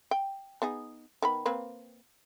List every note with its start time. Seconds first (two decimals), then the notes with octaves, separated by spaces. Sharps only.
0.11 G5
0.62 B3 D#4 G#4
1.22 D#3 B3 B5
1.46 A#3 C4 B4